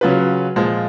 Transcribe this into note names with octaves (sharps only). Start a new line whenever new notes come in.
C#3 F#3 C#4 F4 B4
A#2 F3 G#3